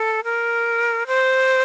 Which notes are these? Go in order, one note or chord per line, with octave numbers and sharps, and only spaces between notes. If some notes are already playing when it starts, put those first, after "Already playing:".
Already playing: A4
A#4
C5